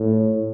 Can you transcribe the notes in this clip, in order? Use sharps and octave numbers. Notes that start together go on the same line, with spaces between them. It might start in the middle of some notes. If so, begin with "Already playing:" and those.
Already playing: A2